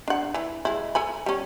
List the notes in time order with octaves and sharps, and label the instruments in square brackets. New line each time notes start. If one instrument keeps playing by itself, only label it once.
[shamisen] D4 F#5
E3
G#3 E4
A4 G#5 B5
G3 C#4